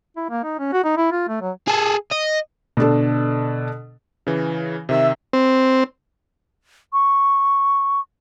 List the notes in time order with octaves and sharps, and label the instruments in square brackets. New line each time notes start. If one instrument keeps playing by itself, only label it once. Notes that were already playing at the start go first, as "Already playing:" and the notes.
[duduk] E4
A#3
D#4
C#4
F#4
D#4
E4
F4
A3
F#3
[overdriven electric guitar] G#4 A4
D#5
[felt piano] B2 D3 D4 A4
[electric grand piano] C#3 E3
[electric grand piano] C3 D#3 [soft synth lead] E5
[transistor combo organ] C4
[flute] C#6